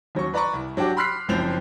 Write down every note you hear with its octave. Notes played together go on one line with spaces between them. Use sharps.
D#2 F#3 C#4 C#6
B4 D5 A#5 B5 C#6
C2
F#3 D4 F#4 G4 D6
B5 C6 F6 F#6 B6 C7
F#1 F#2 F3 C4 G6 F7